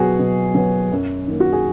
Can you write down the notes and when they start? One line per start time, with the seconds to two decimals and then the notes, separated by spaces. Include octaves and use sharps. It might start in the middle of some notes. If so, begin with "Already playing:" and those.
Already playing: B2 F#3 B3 F#4 G#4
0.19 B2
0.55 F#3 B3
0.92 F#2
1.27 D#3 A#3
1.40 F#4
1.53 G#4